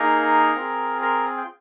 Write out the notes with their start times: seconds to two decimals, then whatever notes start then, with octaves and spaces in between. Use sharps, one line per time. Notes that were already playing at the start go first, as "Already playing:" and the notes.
Already playing: A#3 D#4 G#4 A#4 A#5
0.55 C4 F4 G#4
1.01 A#4 A#5
1.37 G5